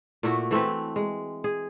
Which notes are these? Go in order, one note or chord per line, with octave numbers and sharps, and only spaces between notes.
A#2 A3 E4 F#4
E3 A3 C4 B4
G#3
G#4